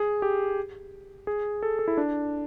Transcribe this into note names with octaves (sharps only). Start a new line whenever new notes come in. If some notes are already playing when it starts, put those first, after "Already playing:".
Already playing: G#4
G4
G#4
A4
A4
E4
D4